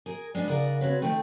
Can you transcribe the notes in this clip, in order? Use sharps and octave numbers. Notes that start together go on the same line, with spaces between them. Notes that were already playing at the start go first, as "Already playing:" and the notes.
G#4 A#4
G#3 B3 D4 D5
C#3 D#4 A#4 F#5
C4 F#4 B4 C#5
D#3 A3 G5